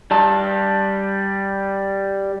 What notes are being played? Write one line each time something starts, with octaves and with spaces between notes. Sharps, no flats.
G3 A5